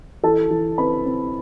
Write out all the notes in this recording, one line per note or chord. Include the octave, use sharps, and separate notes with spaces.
E3 A4 A5
E3
C4 B4 B5
C4